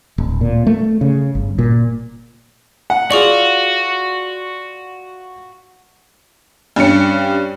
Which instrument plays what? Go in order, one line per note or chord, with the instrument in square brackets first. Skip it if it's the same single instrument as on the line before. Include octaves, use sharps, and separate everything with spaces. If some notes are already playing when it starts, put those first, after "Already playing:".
[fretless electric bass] D1
A#2
A3
C#3
G1
A#2
[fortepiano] F#5
[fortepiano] F4 D5 [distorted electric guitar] F#4 [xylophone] G#4 C#6 F#7
[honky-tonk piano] G2 G3 C#4 C#7